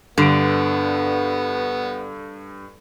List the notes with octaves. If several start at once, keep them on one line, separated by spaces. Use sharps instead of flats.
G2 D3 B3 D7